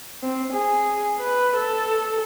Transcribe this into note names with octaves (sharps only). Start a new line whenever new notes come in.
C4
G#4
B4
A4